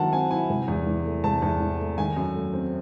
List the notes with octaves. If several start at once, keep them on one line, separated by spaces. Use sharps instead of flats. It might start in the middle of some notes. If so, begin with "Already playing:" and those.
Already playing: D#3 F#3 C4 E4 F#5 A5
C4 G#5
E4 G#5
C3
E2
E3
A3
C3 A5
E2
E3
A3
D#3 G#5
F#2
A3
C4